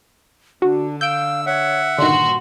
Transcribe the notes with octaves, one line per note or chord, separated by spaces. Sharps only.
D3 D4 F#4
F5 E6 G6 D7
C#5 E5 F#5
G2 A#2 D3 D#3 F#4 C6